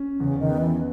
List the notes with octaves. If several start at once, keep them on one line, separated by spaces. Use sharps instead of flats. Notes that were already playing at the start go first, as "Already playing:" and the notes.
Already playing: C#4
E2 C#3
D#3
B3
E3